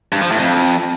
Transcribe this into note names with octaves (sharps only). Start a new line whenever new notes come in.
G2
F3
A2
F2